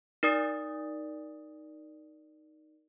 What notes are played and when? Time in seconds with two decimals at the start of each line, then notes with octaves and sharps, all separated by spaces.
0.23 D#4 A#4 D5 D#6 A6